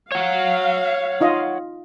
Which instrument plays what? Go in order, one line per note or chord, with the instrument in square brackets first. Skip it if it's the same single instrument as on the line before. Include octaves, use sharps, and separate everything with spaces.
[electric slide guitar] C#5 F#5 [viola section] F5
[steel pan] D#4 F4 D#5